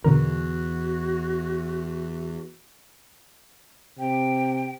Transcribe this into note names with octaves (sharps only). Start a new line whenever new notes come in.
E2 B2 D3 F#4 A#4
C3 G5